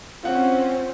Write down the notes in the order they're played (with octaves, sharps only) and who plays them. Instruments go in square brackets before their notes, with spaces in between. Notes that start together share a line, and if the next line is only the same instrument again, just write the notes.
[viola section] C4 C#4 [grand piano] F4 F#5